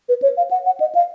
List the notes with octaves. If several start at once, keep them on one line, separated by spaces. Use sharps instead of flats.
B4
C#5
F5
F#5
F#5
D#5
F5